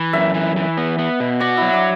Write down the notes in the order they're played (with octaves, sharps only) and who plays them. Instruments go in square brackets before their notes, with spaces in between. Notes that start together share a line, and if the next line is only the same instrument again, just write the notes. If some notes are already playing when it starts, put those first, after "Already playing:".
Already playing: [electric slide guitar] E3
[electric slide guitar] F#2 [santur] E5
[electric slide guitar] E3
E3
B3
B3
B2
[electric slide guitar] F#4 [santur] D5
[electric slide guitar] F#3 [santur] E4
[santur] D4